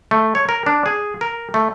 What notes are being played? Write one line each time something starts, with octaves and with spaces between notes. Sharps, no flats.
A3
C#5
A#4
D4
G#4
A#4
A3